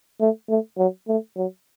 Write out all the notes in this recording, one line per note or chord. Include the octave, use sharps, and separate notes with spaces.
A3
A3
F#3
A3
F#3